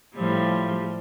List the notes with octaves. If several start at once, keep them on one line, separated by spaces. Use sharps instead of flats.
A2 F3 G3